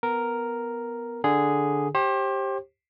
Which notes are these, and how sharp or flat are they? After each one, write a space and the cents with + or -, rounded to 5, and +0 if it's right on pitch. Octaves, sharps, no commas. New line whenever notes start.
B3 +5 A#4 +0
D3 +0 G#4 +0
G4 +0 C5 +35